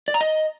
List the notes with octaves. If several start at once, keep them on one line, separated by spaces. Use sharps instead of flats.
D5
A#5
D#5